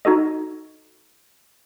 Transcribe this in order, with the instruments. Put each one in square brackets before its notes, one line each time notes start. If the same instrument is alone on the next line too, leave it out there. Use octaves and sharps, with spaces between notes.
[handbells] D#4 F#4 A4 D#5